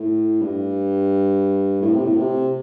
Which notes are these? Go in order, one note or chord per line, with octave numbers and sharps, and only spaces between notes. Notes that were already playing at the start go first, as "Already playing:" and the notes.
Already playing: A2
G2
A2
C3
A2
C3